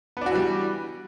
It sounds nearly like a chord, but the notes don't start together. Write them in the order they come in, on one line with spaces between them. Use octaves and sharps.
B3 D4 F#4 E3 G3